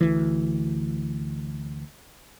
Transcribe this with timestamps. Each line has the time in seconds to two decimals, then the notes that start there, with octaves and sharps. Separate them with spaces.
0.01 D2 E3